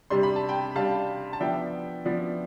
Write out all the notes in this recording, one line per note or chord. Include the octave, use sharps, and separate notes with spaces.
C3 G3 D4 C6
B5
A5
G5 B5
C3 G3 D4 F5 A5
A5
F3 B3 D4 E5 G5
F3 B3 D4